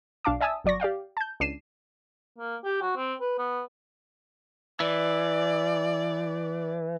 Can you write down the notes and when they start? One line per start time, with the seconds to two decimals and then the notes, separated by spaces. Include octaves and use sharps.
0.25 B1 D4 F5 A5 D6
0.40 D5 E5 G#5 A5 D#6 E6
0.64 G1 F#3 D5 C#6 A#6
0.80 G4 D5 F5 G5
1.17 A5 G6
1.40 C#2 D4 D5 C7 D#7 E7
2.38 A#3
2.64 G4
2.82 F#4
2.97 C4
3.21 B4
3.38 B3
4.80 E3 D5